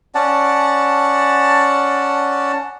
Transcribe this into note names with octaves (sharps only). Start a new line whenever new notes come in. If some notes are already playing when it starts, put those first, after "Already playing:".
C#4 D5 F#5 A5